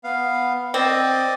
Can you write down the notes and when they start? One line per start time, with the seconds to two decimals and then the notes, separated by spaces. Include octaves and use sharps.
0.04 B3 F5
0.74 C4 D5 D#5